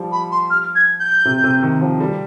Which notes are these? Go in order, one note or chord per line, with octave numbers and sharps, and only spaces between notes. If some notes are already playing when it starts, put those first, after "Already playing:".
Already playing: F3 G3
B5
C6
F6
G#6
G6
C3
C3
D#3
F3
G3